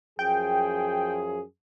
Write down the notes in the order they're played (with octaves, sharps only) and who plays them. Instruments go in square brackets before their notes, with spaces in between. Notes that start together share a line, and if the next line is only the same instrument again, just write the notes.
[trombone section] F#2 F3 G#4 [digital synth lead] G5